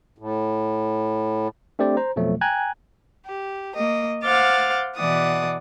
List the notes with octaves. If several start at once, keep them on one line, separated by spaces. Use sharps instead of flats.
A2
A3 C4 D4 G4 C5 D5
C5 A#5
F2 B2 F3 F#3 A3
G5 G#5 A#5 F#6 G#6
G4
A#3 D#5
C5 F5 F#5 D6 F6 A6
B2 E3 D5 F#5 D#6